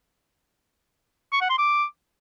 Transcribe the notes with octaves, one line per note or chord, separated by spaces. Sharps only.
C#6
F#5
C6
D6